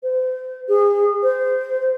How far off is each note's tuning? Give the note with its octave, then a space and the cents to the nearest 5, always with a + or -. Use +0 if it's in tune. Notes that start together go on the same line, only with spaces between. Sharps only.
C5 -35
G#4 -30
C5 -25